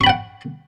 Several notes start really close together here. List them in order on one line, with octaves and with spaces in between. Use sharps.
C#6 B5 G5 F#5